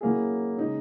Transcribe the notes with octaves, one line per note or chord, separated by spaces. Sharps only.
F#3 A#3 C#4 E4 G#4
C#3 G#3 D#4